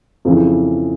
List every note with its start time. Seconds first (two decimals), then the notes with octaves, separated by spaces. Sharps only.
0.25 F2 C#3 E3